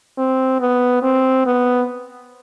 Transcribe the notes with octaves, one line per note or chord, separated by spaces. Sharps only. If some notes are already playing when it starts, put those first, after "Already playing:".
C4
B3
C4
B3